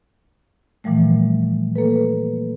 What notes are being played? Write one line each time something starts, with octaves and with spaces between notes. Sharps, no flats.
A#2 E3 F3 G3 A3
A#3 A4 B4